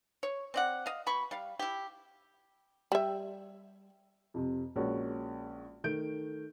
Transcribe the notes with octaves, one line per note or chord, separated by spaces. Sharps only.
C#5
C4 D5 F#5
D#5 F5
B2 B5 C#6
G3 F5
E4 G4
G3 E5
F2 C3
A#1 G#3 C#4 F#4 A#4
D#3 A3 G6 D7